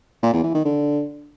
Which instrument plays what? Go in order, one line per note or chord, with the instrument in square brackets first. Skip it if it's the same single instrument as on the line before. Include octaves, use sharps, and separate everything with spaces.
[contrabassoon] A#2
E2
E3
D#3
D3